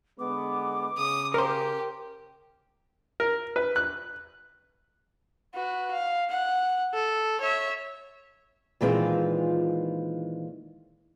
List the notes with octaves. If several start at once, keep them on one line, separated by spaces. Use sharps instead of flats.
D3 G#3 B3 D6
C#3 D#6
G4 A#4 C5
A#4
B4
F#6
F#4 B4
F5
F#5
A4
C#5 E5
A#2 D#3 E3 G#3 C4 F4